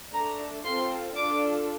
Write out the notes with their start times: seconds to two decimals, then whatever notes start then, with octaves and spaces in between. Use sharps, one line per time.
0.13 A3 D4 A4 A#5
0.64 C4 F4 A4 C6
1.16 D4 F4 A4 D6